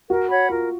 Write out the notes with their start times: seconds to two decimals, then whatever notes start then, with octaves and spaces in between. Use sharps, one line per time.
0.09 F#4 A#4
0.29 C#5 F#5 B5
0.49 F4 A#4